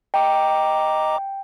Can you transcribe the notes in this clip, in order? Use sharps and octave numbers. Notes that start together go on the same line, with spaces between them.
D#5 G5 A#5 D6